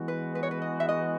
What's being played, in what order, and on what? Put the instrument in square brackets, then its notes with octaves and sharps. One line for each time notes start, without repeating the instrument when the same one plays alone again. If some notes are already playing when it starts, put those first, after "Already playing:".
Already playing: [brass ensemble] E3 G#3 B3 F#4
[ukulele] B4
B4
C#5
B4
D#5
E5
D#5